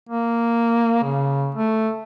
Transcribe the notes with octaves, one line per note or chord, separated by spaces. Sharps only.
A#3
C#3
A3